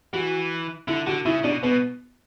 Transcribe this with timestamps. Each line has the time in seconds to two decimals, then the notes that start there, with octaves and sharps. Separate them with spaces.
0.13 E3 F#4
0.87 D3 E4
1.07 D3 F#4
1.25 C#3 E4
1.44 B2 D4
1.63 B2 B3